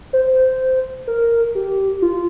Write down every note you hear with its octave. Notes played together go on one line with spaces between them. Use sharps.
C5
A#4
G4
F4